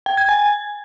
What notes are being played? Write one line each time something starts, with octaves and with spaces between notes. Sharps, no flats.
G5
G#6
G#5